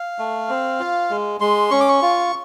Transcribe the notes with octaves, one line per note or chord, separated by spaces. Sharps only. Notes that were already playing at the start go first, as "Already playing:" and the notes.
Already playing: F5
A3
C4
F4
G#3
G#3 C6
C#4 C#6
D6
C#6
F4